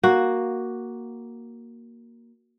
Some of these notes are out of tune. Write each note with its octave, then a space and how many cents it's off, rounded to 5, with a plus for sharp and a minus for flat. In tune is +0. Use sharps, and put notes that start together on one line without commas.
A#3 +5 F#4 +0